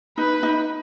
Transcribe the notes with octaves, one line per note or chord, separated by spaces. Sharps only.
D#4 B4
D#4